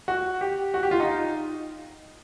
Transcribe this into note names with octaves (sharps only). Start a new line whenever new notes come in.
F#4
G4
F#4
G4
F4
D#4